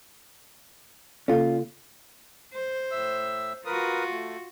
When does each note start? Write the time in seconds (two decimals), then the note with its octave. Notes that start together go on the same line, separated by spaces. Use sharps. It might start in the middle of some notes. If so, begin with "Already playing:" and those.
1.28 C#3 A#3 C#4 F4 A4
2.54 C5
2.91 A2 E5 E6
3.65 F4 F#4 A#4 B4 D#6
4.10 A3